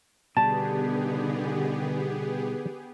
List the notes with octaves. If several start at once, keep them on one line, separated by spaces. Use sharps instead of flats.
B2 D3 D#3 G3 B3 G4 G#4 A5